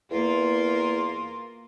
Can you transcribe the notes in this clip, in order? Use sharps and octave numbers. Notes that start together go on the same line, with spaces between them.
E2 A#3 F4 A#4